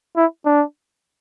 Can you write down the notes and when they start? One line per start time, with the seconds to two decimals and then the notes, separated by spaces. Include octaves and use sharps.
0.16 E4
0.46 D4